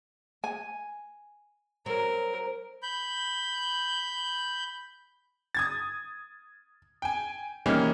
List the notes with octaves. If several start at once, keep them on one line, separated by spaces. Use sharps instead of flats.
G#5
F#3 C4 A#4
B5 G6
D#6 G#6 A6
G5 G#5
D#3 E3 G3 A#3 C#4 D#4